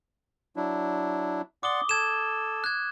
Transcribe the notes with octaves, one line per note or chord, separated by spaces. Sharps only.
F#3 D4 E4
D5 F#5 C6 D6 D#6 G7
A4 G#6 E7
F#6 G#6